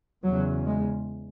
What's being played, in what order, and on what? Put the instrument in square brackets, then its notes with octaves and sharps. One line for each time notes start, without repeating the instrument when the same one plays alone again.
[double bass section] E2 C#3 F#3
G#3